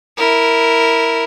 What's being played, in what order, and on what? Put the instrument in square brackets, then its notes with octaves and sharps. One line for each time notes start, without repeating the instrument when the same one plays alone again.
[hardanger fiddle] E4 A#4